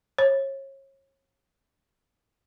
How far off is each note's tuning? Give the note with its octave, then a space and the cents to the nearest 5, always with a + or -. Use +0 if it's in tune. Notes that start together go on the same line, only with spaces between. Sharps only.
C#5 -35